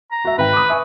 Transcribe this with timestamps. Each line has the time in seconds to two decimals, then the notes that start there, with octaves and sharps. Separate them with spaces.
0.12 A#5
0.25 F#4 E5
0.38 G#1 B4 G5
0.53 D6 D#6
0.69 E5 G#5 C#6